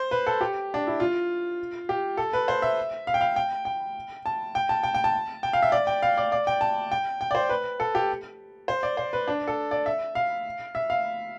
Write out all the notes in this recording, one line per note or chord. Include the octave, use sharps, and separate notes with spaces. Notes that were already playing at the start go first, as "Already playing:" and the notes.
Already playing: C5
B4
A4
G4
D4
E4
F4
G4
A4
B4
C5
E5
F5
G5
F5
G5
G5
A5
G5
A5
G5
G5
A5
G5
F5
E5
D5
G5
F5
D5
D5
G5
A5
G5
G5
D5
C5
B4
A4
G4
C5
D5
C5
B4
D4
A4
D5
E5
F5
E5
F5